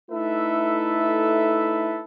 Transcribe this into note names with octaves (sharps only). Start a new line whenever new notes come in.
A3 D#4 E4 A4 B4 E5